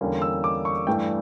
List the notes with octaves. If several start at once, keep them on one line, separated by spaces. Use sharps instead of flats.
E2 D3 G3 A#3 C#4
E6
D6
C#6
G2 E3 A3 D4 G5